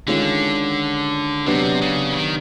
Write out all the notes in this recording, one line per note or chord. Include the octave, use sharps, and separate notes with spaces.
D3 D#3 G#3 C#4 F4
C3 F#3 B3 D4 G4
C#3
E3
D#3